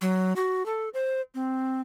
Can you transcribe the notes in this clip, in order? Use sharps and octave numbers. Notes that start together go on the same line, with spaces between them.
F#3
F#4
A4
C5
C4